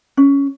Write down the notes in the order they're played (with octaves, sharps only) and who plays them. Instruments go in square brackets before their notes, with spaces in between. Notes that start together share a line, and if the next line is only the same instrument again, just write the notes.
[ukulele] C#4